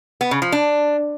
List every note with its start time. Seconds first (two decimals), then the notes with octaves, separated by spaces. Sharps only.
0.21 B3
0.31 C#3
0.42 F3
0.52 D4